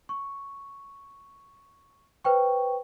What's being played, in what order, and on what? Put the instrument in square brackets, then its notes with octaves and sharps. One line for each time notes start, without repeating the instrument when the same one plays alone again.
[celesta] C#6
B4 C5 G5 C#6